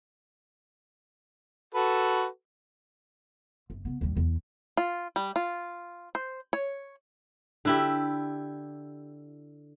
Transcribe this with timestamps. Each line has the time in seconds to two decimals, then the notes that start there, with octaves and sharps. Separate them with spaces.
1.75 F#4 A4 B4
3.70 F#1
3.85 C#3 B3
4.01 D#2 G3
4.17 E2
4.77 F4
5.16 G3
5.36 F4
6.15 C5
6.53 C#5
7.65 D3 E4 G4